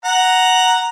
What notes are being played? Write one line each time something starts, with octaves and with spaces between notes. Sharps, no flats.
F#5 A#5